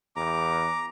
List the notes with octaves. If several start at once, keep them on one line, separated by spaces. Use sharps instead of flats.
E2 A#5 D6